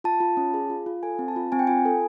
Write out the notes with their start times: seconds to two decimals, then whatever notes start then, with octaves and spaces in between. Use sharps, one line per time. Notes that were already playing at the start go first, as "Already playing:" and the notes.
0.04 F4 A5
0.20 F4
0.37 C#4
0.54 G#4
0.70 F4
0.86 F4
1.03 A4 G#5
1.19 C4
1.28 A5
1.36 F4
1.52 C4 G#5
1.59 G5
1.67 F4 G#5
1.85 A4